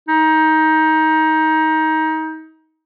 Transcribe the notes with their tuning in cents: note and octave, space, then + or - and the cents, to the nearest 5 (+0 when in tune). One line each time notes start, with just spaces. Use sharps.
D#4 +20